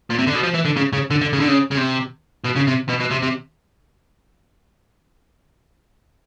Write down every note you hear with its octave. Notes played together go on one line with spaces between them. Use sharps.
A#2
C3
D3
B2
F3
E3
D3
C#3
C#3
D3
D3
C#3
D3
C#3
C#3
C3
B2
C#3
C3
B2
B2
C3
C3